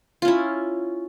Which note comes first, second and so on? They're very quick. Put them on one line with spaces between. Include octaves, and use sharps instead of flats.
F4 C#4 E4